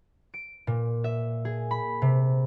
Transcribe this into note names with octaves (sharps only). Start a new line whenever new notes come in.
D7
A#2
E5
G#4
B5
C3